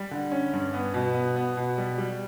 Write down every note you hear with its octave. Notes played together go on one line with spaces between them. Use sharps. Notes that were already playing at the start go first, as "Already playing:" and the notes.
Already playing: G3
D3
C#4
G2
B3
B2
B3
B3
B2
G3
G3